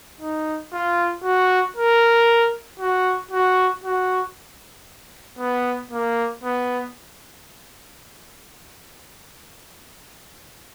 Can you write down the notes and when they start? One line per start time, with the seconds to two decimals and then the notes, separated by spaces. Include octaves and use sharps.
0.21 D#4
0.73 F4
1.24 F#4
1.76 A#4
2.80 F#4
3.31 F#4
3.84 F#4
5.39 B3
5.91 A#3
6.44 B3